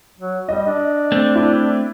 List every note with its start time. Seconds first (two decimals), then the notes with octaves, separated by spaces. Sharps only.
0.18 F#3
0.49 G3 D#5
0.67 D4
1.12 A3 C4
1.35 E4